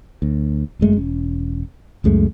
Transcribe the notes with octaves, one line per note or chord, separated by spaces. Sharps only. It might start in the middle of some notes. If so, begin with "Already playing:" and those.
D2
G1 F#2 G#3 A3
E1 C#4
C#2 F#2 G#3 A3